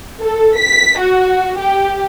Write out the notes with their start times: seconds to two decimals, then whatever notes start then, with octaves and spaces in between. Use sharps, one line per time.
0.21 A4
0.57 B6
0.99 F#4
1.58 G4